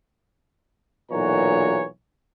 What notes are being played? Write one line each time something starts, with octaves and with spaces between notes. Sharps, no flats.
B1 A#2 E3 F#4 C#5 A#5